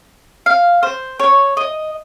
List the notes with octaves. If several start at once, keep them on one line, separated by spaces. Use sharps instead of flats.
F5
C5
C#5
D#5